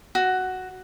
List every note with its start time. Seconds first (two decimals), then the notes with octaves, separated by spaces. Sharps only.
0.15 F#4